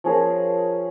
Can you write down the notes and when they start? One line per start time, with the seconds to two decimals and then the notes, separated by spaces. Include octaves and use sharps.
0.04 F3 C#4 G#4 A#4